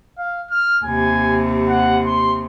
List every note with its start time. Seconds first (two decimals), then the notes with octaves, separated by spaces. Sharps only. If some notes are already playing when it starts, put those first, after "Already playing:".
0.18 F5
0.51 F6
0.84 D#2 C3 G#5
1.69 F#5
2.05 C6